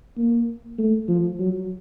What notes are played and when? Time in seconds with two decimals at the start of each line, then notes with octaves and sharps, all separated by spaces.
0.17 A#3
0.78 A3
1.08 F3
1.39 F#3